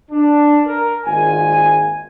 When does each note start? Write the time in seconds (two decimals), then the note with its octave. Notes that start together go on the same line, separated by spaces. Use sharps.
0.10 D4
0.66 A#4
1.05 G#1 A#2 G#5